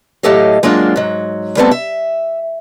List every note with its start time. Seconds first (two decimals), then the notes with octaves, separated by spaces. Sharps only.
0.23 A2 F#3 G4 A4 D#5 F5
0.63 F#3 G#3 A#3 D4 F4
0.96 G#2 F#3
1.57 G3 A3 B3 C4 F4 A4
1.71 E5